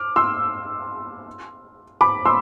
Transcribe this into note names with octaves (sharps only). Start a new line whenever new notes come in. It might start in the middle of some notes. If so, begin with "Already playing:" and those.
Already playing: D6 F6
C6 E6
B5 D6
C6 E6